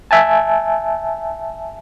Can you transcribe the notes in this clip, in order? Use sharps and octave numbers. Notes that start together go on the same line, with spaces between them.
E5 G#5 A5